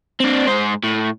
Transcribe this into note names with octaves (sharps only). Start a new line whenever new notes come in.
C4 D4
G#2 C5
A2